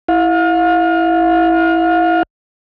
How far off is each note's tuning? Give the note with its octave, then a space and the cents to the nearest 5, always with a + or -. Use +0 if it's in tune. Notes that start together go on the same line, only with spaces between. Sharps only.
E4 +0 F5 +35